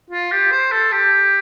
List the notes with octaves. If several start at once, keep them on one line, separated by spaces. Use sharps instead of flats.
F4
G4
C5
A4
G4